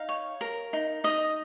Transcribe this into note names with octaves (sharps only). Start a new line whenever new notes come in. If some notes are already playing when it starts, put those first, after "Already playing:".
Already playing: D#4 F5
C#5
A#4
D#4
D#4 D#5